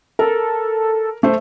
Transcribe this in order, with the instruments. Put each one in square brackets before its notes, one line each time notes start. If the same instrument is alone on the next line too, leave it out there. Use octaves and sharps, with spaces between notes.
[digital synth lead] A4 [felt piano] A#4
[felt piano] A3 C5